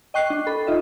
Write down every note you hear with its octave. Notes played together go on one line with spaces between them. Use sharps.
D#5 G5 C#6 F#6 C7
D4
A4 B5
D#4 F4 D#5 E5